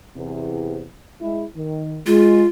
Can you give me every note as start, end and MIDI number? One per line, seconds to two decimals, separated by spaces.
0.16 0.83 40
0.16 0.83 48
1.21 1.44 56
1.21 1.44 64
1.56 1.99 51
2.07 2.44 56
2.07 2.47 65